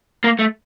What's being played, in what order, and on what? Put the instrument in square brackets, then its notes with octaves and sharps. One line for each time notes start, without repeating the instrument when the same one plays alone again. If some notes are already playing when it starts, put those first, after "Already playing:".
[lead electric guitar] A#3
A3